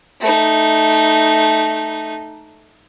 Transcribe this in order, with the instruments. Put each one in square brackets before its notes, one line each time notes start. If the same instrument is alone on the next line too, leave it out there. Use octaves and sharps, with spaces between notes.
[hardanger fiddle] A3 D#4